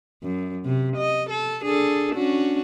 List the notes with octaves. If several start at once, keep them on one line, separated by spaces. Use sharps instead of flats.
F#2
C3
D#5
A4
D4 G#4 A4
C#4 D4 F#4